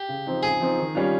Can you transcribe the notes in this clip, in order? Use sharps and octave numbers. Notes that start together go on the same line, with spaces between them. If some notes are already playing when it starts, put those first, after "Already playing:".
Already playing: G4
C#3
F3 C4 D#4
C#3 G#4
F3 C4 D#4
D#3
G3 C#4 F4